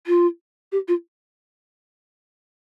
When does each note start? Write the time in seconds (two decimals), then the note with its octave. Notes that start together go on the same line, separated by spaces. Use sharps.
0.07 F4
0.72 G4
0.88 F4